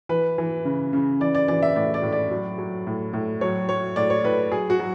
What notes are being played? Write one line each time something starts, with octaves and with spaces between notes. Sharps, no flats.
E3 B4
E3
C#3
C#3
E3 D5
D5
E3 D5
E5
A2 D5
D5
A2
D5
F#3
F#3
A2
A2
F#3 C#5
F#3 C#5
A2 D5
C#5
A2 B4
F#3 G#4
F#4
F#3